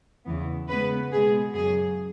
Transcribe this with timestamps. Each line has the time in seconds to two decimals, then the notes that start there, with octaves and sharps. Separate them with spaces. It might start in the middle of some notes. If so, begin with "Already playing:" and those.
0.25 E2 C#3 E3 B3
0.68 C#3 G#3 B3 B4
1.11 B2 G#3 B3 G#4
1.54 F#2 C#3 F#3 G#4